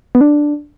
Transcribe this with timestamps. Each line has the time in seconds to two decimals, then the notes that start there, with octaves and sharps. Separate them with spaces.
0.15 B3
0.21 D4